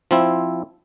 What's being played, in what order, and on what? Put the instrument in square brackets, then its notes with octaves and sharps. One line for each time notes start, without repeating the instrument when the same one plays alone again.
[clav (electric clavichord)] F3 C4 E4